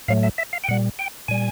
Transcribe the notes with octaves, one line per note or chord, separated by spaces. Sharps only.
A2 F#3 A3 F5
E5
E5
F5
G5
A#2 G3 F#5
G5
A#2 G3 G#5